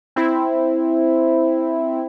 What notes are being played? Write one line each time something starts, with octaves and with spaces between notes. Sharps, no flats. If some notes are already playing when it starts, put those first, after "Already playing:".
C4 E4